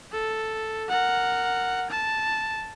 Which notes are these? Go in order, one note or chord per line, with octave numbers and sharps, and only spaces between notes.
A4
A#4 F#5
A5